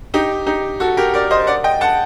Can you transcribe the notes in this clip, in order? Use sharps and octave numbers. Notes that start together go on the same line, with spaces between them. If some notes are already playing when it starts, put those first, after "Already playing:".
D#4 G4
D#4 G4
F#4 A4
G4 A#4
A#4 D5
C5 D#5
D5 F#5
D#5 G5
F#5 A5